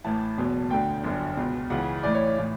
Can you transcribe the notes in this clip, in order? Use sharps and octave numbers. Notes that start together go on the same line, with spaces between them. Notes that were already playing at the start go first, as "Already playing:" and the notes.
A1 A2 E3 A5
F#1 E2 B2
D2 D3 G5
G1 F#2 D3
C#2 B2
C#2 C#3 E3 F#5
A1 A2 E3 D5
C#5
A2 E3